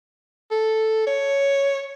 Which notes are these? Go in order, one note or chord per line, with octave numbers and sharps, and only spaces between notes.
A4
C#5